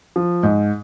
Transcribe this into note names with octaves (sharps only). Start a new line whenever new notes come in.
F3
G#2